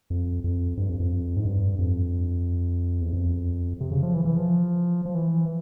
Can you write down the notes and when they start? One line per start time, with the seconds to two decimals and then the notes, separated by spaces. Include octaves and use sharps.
0.10 F2
0.44 F2
0.77 G2
0.89 F2
1.00 F2
1.37 G#2
1.45 G2
1.79 F2
3.01 E2
3.13 F2
3.80 C3
3.91 C#3
4.03 F3
4.14 E3
4.25 E3
4.36 F3
5.05 F3
5.15 E3